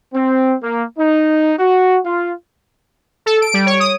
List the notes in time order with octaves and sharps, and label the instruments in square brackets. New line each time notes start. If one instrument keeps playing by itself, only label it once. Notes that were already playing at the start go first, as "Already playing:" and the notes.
[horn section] C4
A#3
D#4
F#4
F4
[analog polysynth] A4
D7
G3
C#5
D#6